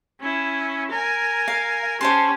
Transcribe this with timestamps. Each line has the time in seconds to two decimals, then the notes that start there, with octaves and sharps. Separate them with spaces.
0.21 C#4 E4
0.91 A#4 G#5
1.48 F5
2.01 C#4 G4 C5 A5 C6